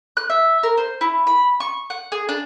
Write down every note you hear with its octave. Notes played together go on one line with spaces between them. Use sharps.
F#6
E5
A#4
C5
E4
B5
C#6
F#5
G#4
D4